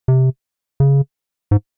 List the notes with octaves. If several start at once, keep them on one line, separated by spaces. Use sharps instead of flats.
C3
C#3
G#2